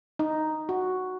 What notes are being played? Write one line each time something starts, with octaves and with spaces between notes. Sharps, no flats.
D#4
F#4